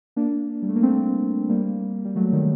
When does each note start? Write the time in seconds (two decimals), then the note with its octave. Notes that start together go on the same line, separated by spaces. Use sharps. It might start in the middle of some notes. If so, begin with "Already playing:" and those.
0.16 A#3 D4
0.62 G3
0.69 A3
0.76 A#3
0.83 A3 C4
1.49 G3 A#3
2.05 G3
2.16 F#3 A3
2.33 D#3 G3